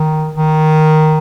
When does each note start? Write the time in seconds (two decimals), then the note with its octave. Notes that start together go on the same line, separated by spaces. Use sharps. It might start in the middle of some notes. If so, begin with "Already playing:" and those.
Already playing: D#3
0.36 D#3